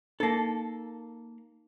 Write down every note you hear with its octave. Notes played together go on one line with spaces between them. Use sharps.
A#3 D#4 A4